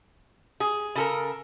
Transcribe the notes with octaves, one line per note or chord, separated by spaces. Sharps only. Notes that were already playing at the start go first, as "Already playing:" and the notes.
G#4
C#3 A4 A#4